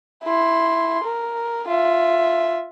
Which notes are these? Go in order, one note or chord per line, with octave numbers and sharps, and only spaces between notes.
E4 C6
A#4
F4 E5